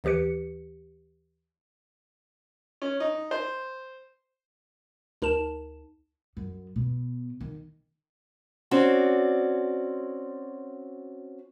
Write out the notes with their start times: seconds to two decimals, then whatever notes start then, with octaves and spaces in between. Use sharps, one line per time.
0.04 D#2 E3 G4 B4 C#7
2.82 C#4
3.00 D#4
3.31 C5
5.22 D2 D#4 A#4 A5 E7
6.37 F#2
6.76 B2
7.41 D#3
8.71 C4 C#4 F#4 D5